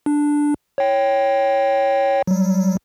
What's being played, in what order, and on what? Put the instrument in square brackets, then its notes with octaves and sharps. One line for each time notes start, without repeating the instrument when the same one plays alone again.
[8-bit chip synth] D4
C#5 G5
F#3 G3